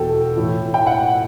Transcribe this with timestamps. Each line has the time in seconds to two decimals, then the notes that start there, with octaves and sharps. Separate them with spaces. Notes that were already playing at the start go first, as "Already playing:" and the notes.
Already playing: E2 B2 F#4 A4 G5
0.35 A2 E3
0.74 G5
0.87 F#5